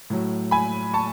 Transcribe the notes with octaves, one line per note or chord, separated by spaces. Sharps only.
A2 F#3
G#5 B5
A5 C#6